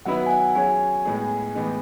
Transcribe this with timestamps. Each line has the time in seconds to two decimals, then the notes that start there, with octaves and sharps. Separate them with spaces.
0.06 D#3 F#3 B3 E4 B4 F#5
0.26 G#5
0.30 F#5
0.55 F#3 C#4 G#4 C#5 G#5
1.05 A2 G#3 B3 D#4 G#4
1.55 A2 E3 G#3 B3 D#4